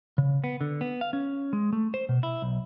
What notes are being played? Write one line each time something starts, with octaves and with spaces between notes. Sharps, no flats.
C#3
B3
D3
B3
F5
C#4
G#3
A3
C5
B2
E4
B1